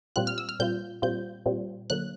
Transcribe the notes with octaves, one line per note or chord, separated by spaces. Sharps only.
A#2 G3 C4 F4 F#6
F6
E6
F6
A#2 G3 C4 F4 G6
A#2 G3 C4 F4 G6
A#2 G3 C4 F4
D3 F#3 A#3 F#6